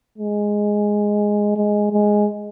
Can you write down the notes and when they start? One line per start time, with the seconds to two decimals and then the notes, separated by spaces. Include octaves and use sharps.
0.18 G#3
1.57 G#3
1.91 G#3